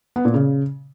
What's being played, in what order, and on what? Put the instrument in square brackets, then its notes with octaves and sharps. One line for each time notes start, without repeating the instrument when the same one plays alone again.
[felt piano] B3
A#2
C#3